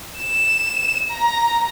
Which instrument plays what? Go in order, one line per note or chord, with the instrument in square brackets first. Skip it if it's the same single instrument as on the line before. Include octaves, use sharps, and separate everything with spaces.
[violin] E7
A#5